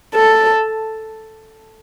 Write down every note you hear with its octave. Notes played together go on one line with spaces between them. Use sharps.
A4